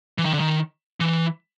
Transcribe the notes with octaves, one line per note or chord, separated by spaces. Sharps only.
E3
D#3
D3
D#3
E3